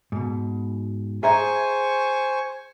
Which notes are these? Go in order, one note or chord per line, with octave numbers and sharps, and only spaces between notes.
G#2 B2
G#4 C5 D#5 E5 G#5 A#5 C#6